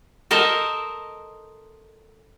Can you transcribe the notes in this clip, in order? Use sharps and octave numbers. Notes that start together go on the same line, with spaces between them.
A4 A#4 C5 D#5